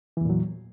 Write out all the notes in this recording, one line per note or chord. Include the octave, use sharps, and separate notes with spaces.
E2 A#2 E3 F#3